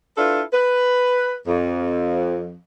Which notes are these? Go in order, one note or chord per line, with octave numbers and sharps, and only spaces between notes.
D4 E4 F4 A4 B4
B4
F2